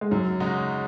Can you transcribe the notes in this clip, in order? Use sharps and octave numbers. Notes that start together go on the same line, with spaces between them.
G#3
F#2 F#3
C#3 G#3 D#4 F#4